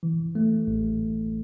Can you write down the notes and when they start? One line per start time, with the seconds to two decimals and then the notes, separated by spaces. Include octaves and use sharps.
0.03 E3
0.35 A3
0.67 A1